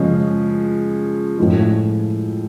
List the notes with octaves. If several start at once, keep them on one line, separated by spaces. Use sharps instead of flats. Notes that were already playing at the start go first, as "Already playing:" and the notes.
Already playing: C#3 F3 G#3 C#4
A2 F3 G#3